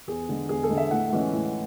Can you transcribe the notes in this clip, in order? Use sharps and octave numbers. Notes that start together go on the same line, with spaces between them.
E2 G#4
D3 G#3
E2 G#4
A4
D3 G#3
E5
A2 F#5
E3 G#3 C#4
A2